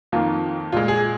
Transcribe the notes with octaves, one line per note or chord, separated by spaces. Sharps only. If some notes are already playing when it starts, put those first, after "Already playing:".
F2 D#3 A#3 F4
A#2 G#3 F4
G#4